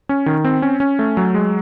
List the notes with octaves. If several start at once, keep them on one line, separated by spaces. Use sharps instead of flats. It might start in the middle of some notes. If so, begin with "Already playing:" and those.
C#4
D#3
C4
C#4
C#4
A3
F#3
G#3